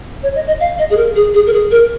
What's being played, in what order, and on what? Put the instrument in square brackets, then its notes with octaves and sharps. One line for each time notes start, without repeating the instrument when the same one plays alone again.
[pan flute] C#5
D#5
D#5
F5
D#5
G#4
A#4
G#4
G#4
A#4
G#4
A#4